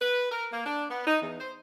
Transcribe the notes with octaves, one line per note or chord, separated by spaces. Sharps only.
B4
A#4
A#3
D4
B3
D#4
E2
C5